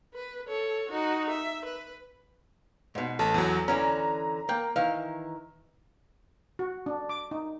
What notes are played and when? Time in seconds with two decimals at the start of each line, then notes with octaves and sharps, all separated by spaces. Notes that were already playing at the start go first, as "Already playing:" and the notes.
0.14 B4
0.48 A4 C#5
0.89 D#4 F#4
1.30 E5
1.65 B4
2.95 G#2 B2
3.19 A1 A4 A5
3.34 E2 F#3
3.68 D3 E3 C#4 A#5
4.49 A#3 G5
4.76 D#3 E3 F5
6.59 F#4
6.86 D4
7.09 D6
7.31 D#4